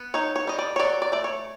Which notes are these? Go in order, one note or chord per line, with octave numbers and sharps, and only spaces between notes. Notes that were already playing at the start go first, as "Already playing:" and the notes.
Already playing: B3
D#4 C#5
C#5
G3 D#5
D5
C#5
F#3 D5
D5
A3 D5
C#5